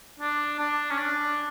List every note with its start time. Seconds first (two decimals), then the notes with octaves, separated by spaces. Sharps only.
0.19 D4
0.59 D4
0.90 C#4
0.98 D4